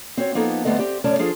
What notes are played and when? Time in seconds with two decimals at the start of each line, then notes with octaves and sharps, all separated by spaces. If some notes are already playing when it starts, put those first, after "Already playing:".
0.17 C4 F#4 C#5
0.35 F3 A#3 B3 D#4 A4
0.65 D3 G3 A3 B3 C4 D#5
0.79 C4 G4
1.04 F#2 C#3 A3 C#4 D5 A5
1.19 F3 D4 F4 G#4 A4